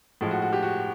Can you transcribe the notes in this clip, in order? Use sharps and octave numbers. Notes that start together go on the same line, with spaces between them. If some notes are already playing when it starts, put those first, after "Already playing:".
A2 F3 G#3
F#4
F#4
G4
F#4